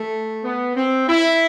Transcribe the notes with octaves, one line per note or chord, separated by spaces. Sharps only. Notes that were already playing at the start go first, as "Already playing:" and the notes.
Already playing: A3
B3
C4
E4